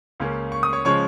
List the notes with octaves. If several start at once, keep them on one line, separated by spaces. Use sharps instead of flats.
C#2 C#3 A#3 C#4
C#6
D#6
C#5 C#6
C#3 F3 G#3 C#5 C#6